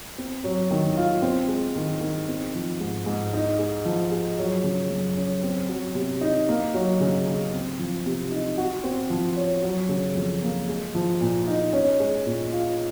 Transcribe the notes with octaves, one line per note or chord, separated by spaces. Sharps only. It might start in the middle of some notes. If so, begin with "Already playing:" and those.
C4
F#3
D#3
F4
C4
G#3
D#3
D#3
C4
F3
G#2
G#2
D#4
G#3
F3
G#4
F#3
C#3
F#2
C#4
C4
F#3
C3
D#4
A#3
F#3
C#3
C#3
C4
F3
C3
D#4
F#4
C4
F3
C#5
F#3
C#3
F2
A#3
G#3
F3
A#2
D#4
C#4
G#3
A#2
F4